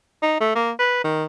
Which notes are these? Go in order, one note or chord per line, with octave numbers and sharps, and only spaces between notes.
D#4
A3
A#3
B4
D#3